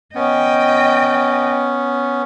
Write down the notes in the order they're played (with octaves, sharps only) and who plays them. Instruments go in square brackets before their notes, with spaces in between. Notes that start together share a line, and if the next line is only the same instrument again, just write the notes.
[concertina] B3 C#4 [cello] D#5 G5